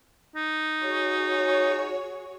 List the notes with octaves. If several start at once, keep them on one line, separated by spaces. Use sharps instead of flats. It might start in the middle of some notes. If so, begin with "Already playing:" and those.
D#4
F#4 G#4 C#5